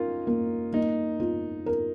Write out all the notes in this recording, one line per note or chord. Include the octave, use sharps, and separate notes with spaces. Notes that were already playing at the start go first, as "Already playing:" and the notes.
Already playing: C#4 D#4 F4 A#4
A#3
A#3 D#4
F4
A#4